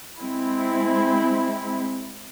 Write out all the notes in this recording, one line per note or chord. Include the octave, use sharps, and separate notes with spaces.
G#3 C4 E4